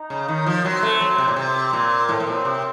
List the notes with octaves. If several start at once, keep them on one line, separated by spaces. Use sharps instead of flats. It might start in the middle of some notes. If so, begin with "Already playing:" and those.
Already playing: D#4
C#3
D#3
F3
F#3 C4
A3
F#3
C3
A#2
C3 C4
A#2
A2 C4
A2
A#2
C3